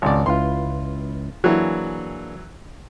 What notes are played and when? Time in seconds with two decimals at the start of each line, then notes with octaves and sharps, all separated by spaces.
0.02 G#1 C#2 C#5 D5
0.26 C#2 E4 F4 B4 C6
1.44 E3 F#3 A#3 D4 G#4